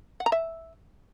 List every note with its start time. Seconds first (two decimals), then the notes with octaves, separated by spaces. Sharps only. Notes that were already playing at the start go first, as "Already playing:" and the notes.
0.20 F#5
0.26 A#5
0.32 E5